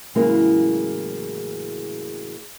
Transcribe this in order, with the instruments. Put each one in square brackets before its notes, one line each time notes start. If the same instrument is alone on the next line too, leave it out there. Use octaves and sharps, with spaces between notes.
[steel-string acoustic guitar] A2 C#3 E3 F#3 G#3 A#3